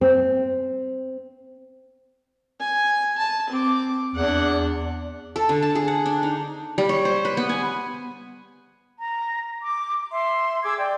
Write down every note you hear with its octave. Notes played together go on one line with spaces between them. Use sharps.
C4
G#5
A5
C4 D6
E2 D4 F#5
A4
D3
A5
G#4
F#5
D4
D#4
G3
C#5
C5
B4
B3
G#5
A#5
D6
E5 C6
G#4 D6 E6 G#6
D5 G5